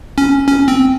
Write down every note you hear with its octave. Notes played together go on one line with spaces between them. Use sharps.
C#4
C#4
C4